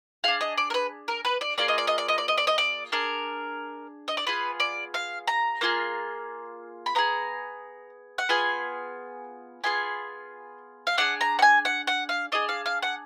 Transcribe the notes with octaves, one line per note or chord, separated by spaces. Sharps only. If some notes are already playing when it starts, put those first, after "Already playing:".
D4 G#4 F5
D#5
D5
A#4
B4
A#4
B4
D5
A#3 F4 G#4 D5
D#5
D5
D#5
D5
D#5
D5
D#5
D5
D#5
D5
D4 G#4 A#4
D#5
D5
B3 F4 G#4 B4
D5
F5
A#5
A#3 F4 G#4
B5
B3 F4 G#4 A#5
F#5
B3 F4 G#4 G#5
B3 F4 G#4 G#5
F5
D4 G#4 F#5
A#5
F#5
G#5
F#5
F#5
F5
D4 G#4 D#5
F5
F5
F#5